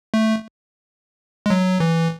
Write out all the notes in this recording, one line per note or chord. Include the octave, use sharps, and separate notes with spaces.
A3
G#3
F#3
E3